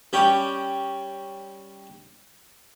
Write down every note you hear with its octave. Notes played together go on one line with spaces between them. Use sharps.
G3 C#4 C#5 G5 D6